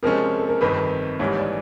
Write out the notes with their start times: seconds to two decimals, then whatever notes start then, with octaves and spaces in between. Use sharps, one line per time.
0.03 C3 F3 G#3 C#4 A#4
0.38 A4
0.49 A#4
0.61 G1 F2 C3 D#3 B4
1.19 A#1 G#2 E3 G3 C#5
1.39 D5